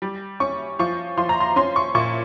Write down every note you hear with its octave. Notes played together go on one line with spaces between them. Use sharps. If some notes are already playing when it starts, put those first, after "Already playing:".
G3
C#4 C#6
F3 C#6
F3 C6
A#5
C6
C#4 C6
C#6
A#2 C#6